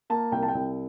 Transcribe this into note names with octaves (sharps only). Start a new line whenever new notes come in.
A#3 A5
C2 G5
A5
G5
C2